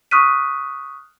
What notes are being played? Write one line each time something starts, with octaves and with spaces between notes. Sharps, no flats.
C#6 D#6 F6 F#6 B6 D#7